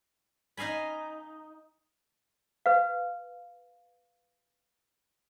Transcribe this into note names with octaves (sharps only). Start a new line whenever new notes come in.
D#4 D#5 F5 G#5 B5
B4 F5